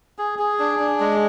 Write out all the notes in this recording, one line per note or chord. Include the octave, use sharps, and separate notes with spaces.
G#4
G#4
D4
D4
G#3